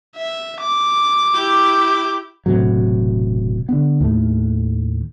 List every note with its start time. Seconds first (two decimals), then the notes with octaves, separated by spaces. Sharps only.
0.17 E5
0.61 D6
1.33 E4 G4
2.46 E1 A2 C3 F#3
3.69 D3 B3
4.01 D#2 A2 A3